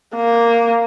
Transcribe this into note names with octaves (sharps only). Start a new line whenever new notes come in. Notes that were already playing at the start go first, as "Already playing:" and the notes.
A#3